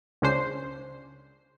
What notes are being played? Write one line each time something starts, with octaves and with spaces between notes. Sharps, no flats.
C#2 C#3 C#4 D4 C5 C7